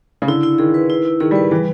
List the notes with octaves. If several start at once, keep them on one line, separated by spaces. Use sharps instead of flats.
C#3
D3 E4
E4
D#3 G#4
B4
E4
E4
D#3 G#4
G3
B4
E3 G3